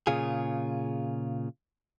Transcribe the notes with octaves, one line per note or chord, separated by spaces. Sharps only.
A#2 C#3 F4 G#4